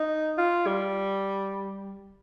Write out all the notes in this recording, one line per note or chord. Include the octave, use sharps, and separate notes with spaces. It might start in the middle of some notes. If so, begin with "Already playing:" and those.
Already playing: D#4
F4
G3